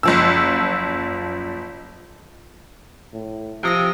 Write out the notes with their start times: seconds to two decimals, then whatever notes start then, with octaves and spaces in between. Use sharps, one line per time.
0.03 F#1 F3 E6
3.14 A2
3.63 C3 F3 G5 D#6 A#6